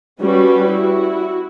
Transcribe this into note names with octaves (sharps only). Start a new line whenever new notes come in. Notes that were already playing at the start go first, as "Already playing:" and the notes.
G3 C#4 F#4 B4
E4 F#4